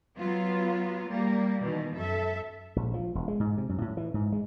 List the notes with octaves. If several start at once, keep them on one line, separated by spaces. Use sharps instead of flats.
F#3 B3 F4
G3 A#3
B2 D#3 E3
F#2 A4 E5
A#1
F3
E1
G#3
G#2
C3
F#2
A2
E3
G#2
G#3